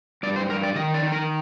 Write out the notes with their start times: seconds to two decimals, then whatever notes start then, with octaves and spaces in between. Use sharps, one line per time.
0.23 G2 D5
0.36 C5
0.49 G2 A#4
0.63 D5
0.75 D#3 D#5
0.94 D5
1.02 D#3
1.12 A#4